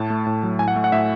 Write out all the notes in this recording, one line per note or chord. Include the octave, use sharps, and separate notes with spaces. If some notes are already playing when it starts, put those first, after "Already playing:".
Already playing: A2 A5
A3
A2
F#3
A2 G#5
F#5
A3
F#5
A2 E5